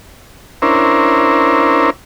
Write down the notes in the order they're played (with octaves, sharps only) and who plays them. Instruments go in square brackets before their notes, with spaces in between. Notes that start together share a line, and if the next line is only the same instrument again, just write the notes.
[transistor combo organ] C#4 D4 E4 A#4 C5